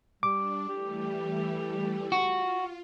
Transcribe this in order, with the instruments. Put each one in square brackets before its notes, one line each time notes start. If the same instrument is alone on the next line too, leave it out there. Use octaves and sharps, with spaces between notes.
[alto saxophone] G3 [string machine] D4 [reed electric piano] D6
[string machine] E3 G3 A3 [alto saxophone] G4
[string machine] F4 [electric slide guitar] F#4